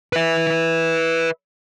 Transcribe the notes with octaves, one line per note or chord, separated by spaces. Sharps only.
B4 E5